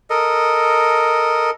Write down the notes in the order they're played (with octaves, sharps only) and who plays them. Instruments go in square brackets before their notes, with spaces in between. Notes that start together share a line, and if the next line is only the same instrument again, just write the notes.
[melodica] A4 A#4 D#5